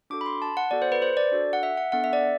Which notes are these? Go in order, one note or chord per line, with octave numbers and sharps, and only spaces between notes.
D4 F#4 A4 D6
B5
C6
A5
F#5
B3 F#4 A4 D5
C5
B4
C5
D5
D4 F#4 A4
F#5
E5
F#5
B3 D4 A4 F#5
E5
D5